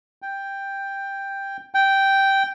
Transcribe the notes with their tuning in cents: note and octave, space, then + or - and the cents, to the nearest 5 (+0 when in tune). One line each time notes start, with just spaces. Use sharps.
G5 +5
G5 -5